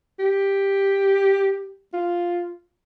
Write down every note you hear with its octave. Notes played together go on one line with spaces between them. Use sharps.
G4
F4